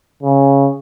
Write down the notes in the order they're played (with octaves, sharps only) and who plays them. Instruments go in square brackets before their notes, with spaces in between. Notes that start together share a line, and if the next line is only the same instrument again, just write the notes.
[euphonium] C#3